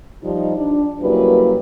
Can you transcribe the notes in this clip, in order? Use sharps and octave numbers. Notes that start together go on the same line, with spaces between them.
F3 G3 D#4
D4
C#3 F#3 G3 A#3 E4 B4